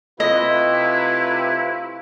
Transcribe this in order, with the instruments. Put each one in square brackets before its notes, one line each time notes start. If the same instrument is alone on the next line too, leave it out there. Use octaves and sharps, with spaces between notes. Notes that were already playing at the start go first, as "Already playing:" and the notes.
[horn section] C3 A3 B4 [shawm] E4 [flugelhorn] F4 [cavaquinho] D#5